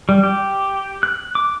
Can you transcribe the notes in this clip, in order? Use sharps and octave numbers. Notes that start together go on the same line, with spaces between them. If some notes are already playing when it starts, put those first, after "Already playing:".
G3
G4
F#6
D6